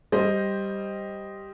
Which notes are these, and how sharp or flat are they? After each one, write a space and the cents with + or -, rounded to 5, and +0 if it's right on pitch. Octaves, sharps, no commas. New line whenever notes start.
G3 +0 C5 +0 D#5 +0